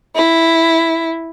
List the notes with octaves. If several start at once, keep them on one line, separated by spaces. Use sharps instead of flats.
E4